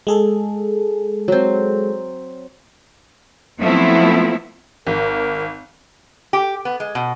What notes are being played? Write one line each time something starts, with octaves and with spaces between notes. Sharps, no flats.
G#3 G#4 A4
F#3 C4
F3 F#3 A3 B3 C4 E4
G#1 A#4
G4
B3
G#3
B2